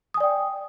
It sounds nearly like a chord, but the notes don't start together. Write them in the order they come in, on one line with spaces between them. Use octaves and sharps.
D#6 G#5 D5 G5